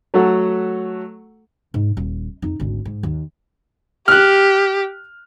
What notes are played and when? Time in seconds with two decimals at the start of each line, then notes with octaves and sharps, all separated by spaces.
0.14 F#3 A3 F#4 A4 F#5
1.74 G#2
1.97 D#1
2.42 F2 D#4
2.60 G#1 D2
2.85 G#2
3.03 D#2
4.08 G4 F6 F#6